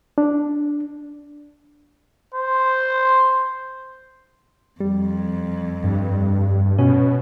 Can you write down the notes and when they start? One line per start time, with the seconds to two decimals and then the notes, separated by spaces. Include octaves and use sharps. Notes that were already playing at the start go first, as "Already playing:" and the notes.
0.18 D4
2.35 C5
4.80 F2 G3
5.84 G2
6.78 B2 C#4